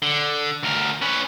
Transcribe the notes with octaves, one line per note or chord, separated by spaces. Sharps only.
D3
D2 A#4
C#4 B4